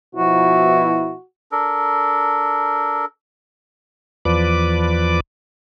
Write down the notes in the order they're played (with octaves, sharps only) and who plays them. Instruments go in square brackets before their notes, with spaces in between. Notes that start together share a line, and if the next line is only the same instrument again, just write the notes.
[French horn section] B2 F3 E4 [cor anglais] F#4
[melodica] D4 A4 A#4
[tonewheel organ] E2 F3 B4 D5 D6